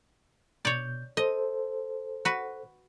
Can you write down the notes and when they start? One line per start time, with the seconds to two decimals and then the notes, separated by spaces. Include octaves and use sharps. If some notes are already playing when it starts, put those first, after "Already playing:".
0.65 B2 C#5 D5 G6
1.17 A4 C5 D#5
2.25 F#4 B4